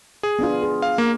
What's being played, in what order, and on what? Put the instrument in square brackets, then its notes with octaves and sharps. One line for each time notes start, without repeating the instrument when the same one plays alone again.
[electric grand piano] G#4
[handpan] B3 D4 F4
G#4
[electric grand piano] F5
A#3